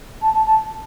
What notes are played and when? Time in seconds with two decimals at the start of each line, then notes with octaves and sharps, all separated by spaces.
0.21 A5
0.33 A5
0.45 A5